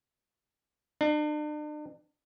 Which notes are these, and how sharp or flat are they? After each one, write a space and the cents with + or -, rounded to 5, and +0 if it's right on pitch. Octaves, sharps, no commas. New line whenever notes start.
D4 +40